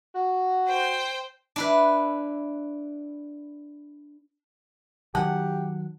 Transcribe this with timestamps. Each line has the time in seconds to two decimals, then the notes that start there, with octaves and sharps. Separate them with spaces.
0.15 F#4
0.67 C5 G5
1.56 D4 E4 B4
5.15 D#3 F#3 G4 F#5 A5